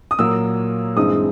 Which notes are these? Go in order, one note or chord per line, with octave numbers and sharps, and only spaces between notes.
D#6
A#2 F#3 A#3 E6
G2 E3 G#3 C4 D#4 D#6